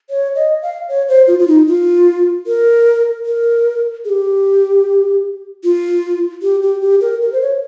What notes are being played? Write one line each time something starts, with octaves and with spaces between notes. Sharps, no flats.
C#5
D#5
F5
C#5
C5
F4
F4
D#4
F4
A#4
A#4
G#4
G4
F4
G4
G4
G4
A#4
A#4
C5
C#5